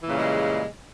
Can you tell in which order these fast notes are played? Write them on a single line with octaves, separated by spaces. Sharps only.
E3 A#2 C#3 G3 G#3